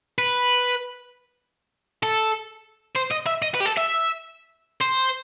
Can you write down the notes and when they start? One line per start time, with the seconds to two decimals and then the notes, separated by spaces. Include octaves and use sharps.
0.18 B4
2.03 A4
2.96 C5
3.11 D#5
3.26 E5
3.42 D#5
3.54 B4
3.60 G4
3.65 A4
3.77 E5
4.81 C5